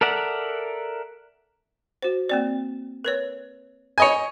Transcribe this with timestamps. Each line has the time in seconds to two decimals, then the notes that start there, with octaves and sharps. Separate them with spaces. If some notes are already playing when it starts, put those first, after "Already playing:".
0.01 A4 A#4 D5 E5 F#5
2.02 F#4 C5
2.29 A#3 C4 D5
3.05 A#4 B4 C#5
3.98 C#5 D#5 G#5